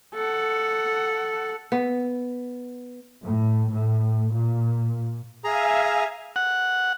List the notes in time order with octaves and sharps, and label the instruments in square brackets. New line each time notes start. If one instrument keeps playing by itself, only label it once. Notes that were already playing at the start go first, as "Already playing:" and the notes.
[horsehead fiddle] A4 F#5
[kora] B3
[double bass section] A2
A2
A#2
[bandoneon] G#4 A#5 [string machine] E5 F5 G#5
[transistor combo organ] F#5